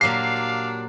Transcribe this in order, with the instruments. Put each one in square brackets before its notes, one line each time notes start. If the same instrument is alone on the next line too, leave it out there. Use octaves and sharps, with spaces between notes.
[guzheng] A#2 F#3 G4 [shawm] D4 [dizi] F5 [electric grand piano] C7